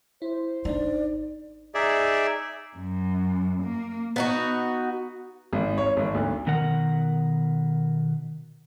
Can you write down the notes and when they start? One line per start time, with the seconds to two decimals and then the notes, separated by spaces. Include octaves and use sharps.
0.22 E4 C5
0.65 G#1 D4 D#4 D5
1.75 D#4 G#4 D5 E5
2.77 F#2
3.63 A#3
4.16 B3 D#4 F#4
5.53 G#1
5.78 C#5
5.97 G#1
6.14 D2
6.47 B2 D#3 A#4 F#5